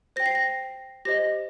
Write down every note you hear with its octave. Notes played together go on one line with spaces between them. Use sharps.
C5 G5 A#6
C7
A#6
G4 C5 D#5 A#6